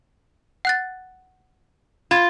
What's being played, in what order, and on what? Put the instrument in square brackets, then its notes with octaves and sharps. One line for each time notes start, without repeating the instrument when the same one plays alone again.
[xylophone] F#5 F#6 A6
[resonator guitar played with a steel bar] F4 [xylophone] B5 G#6